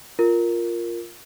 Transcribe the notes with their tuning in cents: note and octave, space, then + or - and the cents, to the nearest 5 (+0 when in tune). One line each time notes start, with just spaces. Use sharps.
F4 +0 A#4 +0